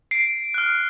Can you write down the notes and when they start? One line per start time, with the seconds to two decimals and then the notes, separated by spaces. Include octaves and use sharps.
0.11 C7 D7
0.54 F6 F#6